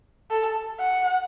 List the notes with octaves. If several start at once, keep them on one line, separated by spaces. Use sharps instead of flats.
A4
F#5